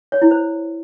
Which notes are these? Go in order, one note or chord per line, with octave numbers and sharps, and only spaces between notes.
C#5
E4
C5